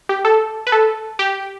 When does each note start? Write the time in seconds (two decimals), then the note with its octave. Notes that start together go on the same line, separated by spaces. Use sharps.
0.09 G4
0.25 A4
0.67 B4
0.72 A4
1.19 G4